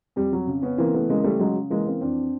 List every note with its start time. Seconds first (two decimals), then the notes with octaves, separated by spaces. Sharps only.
0.16 F2 G3
0.33 F#3
0.47 C#3
0.62 B3 C#4
0.78 E3 A#3 C4
0.94 A3 B3
1.09 C#3 G#3 A#3
1.24 G3 A3
1.40 C#3 F#3 G#3
1.70 E3 G#3 A#3
1.86 A#3 C4
2.01 F2 C4 D4